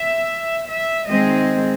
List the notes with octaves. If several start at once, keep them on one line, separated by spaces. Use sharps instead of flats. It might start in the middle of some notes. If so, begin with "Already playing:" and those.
Already playing: E5
E5
D#3 G#3 C4 D#5